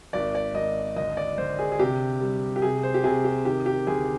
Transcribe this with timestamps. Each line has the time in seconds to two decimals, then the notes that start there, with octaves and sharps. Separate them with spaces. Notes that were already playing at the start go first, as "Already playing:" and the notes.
0.13 G#1 D5
0.35 D5
0.55 G#1 D#5
0.96 D2 D#5
1.17 D5
1.38 D2 C5
1.59 G#4
1.72 G#4
1.79 C3 G4
2.21 G3
2.56 G4
2.62 C3 G#4
2.83 C5
2.94 G4
3.04 C3 G#4
3.24 G4
3.45 D#3 G4
3.66 G4
3.87 D2 G#4